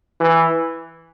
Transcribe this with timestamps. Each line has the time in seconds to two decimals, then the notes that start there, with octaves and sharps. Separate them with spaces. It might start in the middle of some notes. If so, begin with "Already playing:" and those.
0.21 E3